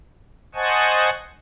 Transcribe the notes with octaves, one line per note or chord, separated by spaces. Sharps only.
C5 D#5 F#5 G#5 A5 C#6